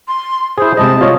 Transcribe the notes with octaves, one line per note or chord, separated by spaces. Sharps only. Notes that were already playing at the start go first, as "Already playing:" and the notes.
C6
E4 G#4 C5
C3 G#3 D#5 A5
F4 C#5 D#5